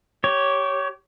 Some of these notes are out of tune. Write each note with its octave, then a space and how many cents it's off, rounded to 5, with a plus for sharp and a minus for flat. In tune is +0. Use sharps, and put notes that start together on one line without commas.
G4 -15 C#5 +0